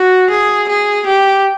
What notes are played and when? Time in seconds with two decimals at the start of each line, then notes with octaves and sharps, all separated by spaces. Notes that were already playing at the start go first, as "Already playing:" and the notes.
Already playing: F#4
0.30 G#4
0.69 G#4
1.07 G4